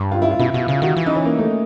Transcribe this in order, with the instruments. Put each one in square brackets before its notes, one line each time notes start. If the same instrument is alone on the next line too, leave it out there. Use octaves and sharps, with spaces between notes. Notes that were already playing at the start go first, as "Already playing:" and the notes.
Already playing: [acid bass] G2
[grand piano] F4
E4
F4
[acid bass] B2 [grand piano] E4
[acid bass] B2 [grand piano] F4
[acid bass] C#3 [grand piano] F4
[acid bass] D#3 [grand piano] F#4
[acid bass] E3
[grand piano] D#4
C#4
A#3
A3